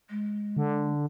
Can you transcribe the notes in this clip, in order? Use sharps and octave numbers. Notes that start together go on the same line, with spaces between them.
G#3
D3